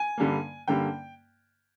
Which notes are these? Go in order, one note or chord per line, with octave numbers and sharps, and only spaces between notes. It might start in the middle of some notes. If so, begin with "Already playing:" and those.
Already playing: G#5
G2 D3 G3 A#3
G2 D3 G3 A#3 G5